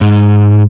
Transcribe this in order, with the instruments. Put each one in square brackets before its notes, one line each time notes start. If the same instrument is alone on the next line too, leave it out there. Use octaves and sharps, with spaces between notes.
[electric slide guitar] G#2